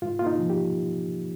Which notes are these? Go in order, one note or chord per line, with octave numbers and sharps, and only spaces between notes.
G#2 F4
A#3 F4
D#4
F3
G4